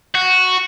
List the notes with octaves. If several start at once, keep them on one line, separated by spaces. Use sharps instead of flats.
F#4